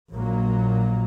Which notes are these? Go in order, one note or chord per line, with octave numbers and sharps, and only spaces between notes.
A#1 A#2 F#3 A#3